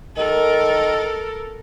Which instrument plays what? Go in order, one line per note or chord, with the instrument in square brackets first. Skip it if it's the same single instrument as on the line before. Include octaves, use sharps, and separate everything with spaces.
[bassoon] D#3 [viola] A4 A#4